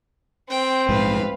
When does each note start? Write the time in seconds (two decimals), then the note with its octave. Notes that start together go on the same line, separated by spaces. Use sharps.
0.50 C4 G5
0.89 A#1 G#2 B4 F5